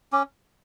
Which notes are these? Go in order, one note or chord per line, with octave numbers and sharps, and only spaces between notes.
C#4 D6